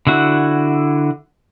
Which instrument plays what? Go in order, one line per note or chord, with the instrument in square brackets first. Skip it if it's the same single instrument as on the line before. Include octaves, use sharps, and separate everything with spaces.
[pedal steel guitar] D3 E4 F#4